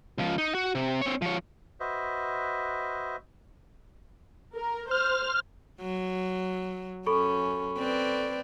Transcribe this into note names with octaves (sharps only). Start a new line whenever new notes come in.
C#2 F3
D#4
F#4
C3
C4 C#5
F3 C#5
F#4 B4 C5 D#5 E5
A#4
C5 F6
F#3
F#2 C#4 A4 B5 C#6
C4 B4 D5